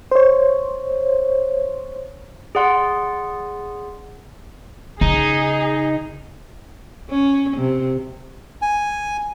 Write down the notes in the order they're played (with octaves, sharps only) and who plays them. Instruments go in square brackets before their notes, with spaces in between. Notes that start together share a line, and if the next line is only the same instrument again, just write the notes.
[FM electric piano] C5 C#5
[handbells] G#4 D5 F#5 C6
[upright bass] C#3 [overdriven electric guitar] D#4 [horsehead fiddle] G#4
[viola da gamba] C#4
C3
[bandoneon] G#5